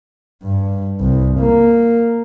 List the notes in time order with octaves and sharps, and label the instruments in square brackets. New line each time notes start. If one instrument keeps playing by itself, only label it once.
[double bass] G2
C2
A#3